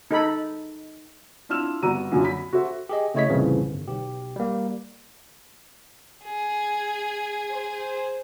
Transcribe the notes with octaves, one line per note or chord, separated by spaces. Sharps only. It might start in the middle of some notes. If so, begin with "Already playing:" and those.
D#4 A4 B5
D4 E4 F4 E6 F6 E7
G1 F#4 D5 A#5 E6 D#7
A#1 F#2 A#2 D3 F#3
B5 B6
F#4 A4 C5 E5
G4 G#4 D#5
C#3 A3 E4 C#5 D#5 B6
C2 F2 A2 C#3 E3 F3
G1
B1 G4
G3 A#3
G#4
C5